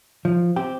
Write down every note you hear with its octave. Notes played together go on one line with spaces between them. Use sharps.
F3
C4 G4